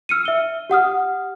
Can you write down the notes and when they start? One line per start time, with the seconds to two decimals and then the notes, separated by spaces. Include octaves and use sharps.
0.09 E6 F6 C#7 D#7
0.25 E5 G7
0.70 G4 F#5 D#6 F6